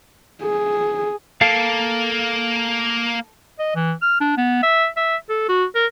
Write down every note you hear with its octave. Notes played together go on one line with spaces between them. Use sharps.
G#4
A#3 A4 F5
D#5
E3
F6
D4
B3
E5
E5
A4
F#4
A#4